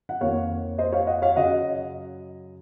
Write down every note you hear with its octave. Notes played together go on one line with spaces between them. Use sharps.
F#5
F2 D#3 A#3 C#5 F5
C5 D#5
C#5 F5
D#5 F#5
C#5 F5
F#2 C#3 F#3 D#5 F#5